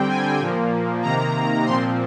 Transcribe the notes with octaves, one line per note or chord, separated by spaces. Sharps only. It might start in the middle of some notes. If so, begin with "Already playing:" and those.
Already playing: D3 G3 C4 G5
G#5
A#2 F3 A#3
C3 D#3 A#3 A#5
A#2 F3 C4 C6